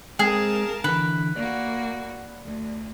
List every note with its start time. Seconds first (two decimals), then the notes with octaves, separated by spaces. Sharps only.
0.19 G#3 C4 G#4 A#4 F5 A5
0.84 D3 E3 B4
1.36 A#3 F#4 D5
2.44 D2